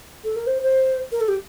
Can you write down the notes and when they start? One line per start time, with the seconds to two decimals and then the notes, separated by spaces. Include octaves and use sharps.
0.25 A4
0.36 A#4
0.47 C5
0.63 C5
1.12 A#4
1.21 A4
1.28 G4